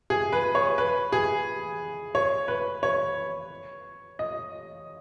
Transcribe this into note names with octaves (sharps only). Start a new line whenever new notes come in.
G#4
B4
C#5
B4
G#4
C#5
B4
C#5
D#5